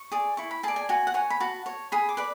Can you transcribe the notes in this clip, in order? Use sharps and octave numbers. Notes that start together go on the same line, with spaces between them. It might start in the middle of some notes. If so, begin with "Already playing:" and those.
Already playing: C#6
G#4 D5
E4 C#6
B5
G#4 D5 A5
G#5
F#4 G#5
F#5
C#5 G#5
B5
F#4 A5
C#5
G#4 B5
D6
B4 D5